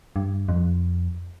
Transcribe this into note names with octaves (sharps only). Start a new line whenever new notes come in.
G2
F2